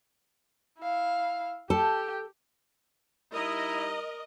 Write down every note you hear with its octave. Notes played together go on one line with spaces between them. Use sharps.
E4 F5
G4 A4 G5 A5
G3 D#4 E4 A#4 D#5 A#5